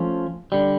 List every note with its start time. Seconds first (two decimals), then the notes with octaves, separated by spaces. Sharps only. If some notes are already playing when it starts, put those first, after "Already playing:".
Already playing: F3 A3 C#4 F4
0.52 D3 G3